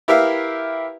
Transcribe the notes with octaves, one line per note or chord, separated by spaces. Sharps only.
E4 G4 A#4 B4 E5 F5